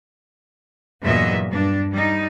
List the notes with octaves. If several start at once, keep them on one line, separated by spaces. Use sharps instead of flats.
E2 G2 A#2 F#3 D#5 E5
G2 D4
G3 D#4